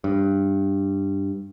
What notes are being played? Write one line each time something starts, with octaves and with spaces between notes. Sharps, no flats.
G2